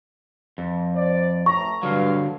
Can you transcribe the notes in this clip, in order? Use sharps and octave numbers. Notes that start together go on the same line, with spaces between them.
F2
C5 D5
A1 A2 A#5 C#6
G2 D3 F#3 F5